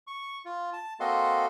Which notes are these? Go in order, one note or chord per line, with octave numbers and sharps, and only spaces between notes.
C#6
F4
A5
A#3 C4 F#4 A4 D#5 C6